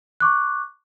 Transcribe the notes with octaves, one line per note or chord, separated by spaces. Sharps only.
C#6 D6 F#6